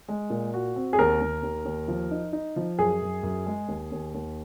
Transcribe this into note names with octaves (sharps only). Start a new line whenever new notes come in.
G#3
A#2
F#4
C4
G#4
D#2 A#4
D#2
D#2
D#2
F3
D#4
D#4
F3
F#2 G#4
F#2
F#2
G#3
D#2
D#2
D#2